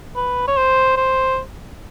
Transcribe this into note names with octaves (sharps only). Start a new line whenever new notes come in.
B4
C#5
C5
C5